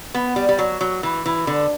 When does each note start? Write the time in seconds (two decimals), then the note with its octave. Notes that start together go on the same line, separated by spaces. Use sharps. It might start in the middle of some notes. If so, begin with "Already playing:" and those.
0.15 B3
0.36 G3
0.49 G3
0.59 F#3
0.81 F#3
1.03 E3
1.26 E3
1.47 D3